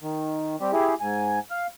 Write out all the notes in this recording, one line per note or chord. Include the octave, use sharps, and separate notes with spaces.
D#3
G3 C4 G4
E4 G4 G#4
G#2 G#5
F5